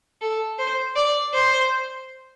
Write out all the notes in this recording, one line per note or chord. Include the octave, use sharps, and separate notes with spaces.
A4
C5
D5
C5